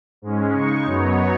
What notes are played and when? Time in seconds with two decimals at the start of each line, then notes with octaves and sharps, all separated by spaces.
0.22 G#2 G#3 C#4
0.53 C#3 G#3 D#4 C#6
0.86 F#2 F#3 B3 D#4 C#5